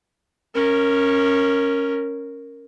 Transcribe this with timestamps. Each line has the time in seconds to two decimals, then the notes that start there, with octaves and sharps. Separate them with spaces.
0.55 C#4 A#4